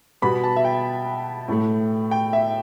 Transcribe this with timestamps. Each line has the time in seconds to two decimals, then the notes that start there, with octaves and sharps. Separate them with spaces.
0.22 B2 G3 B3 B5
0.44 A5
0.56 E5
0.65 G5
1.48 A2 A3
2.11 G5
2.33 E5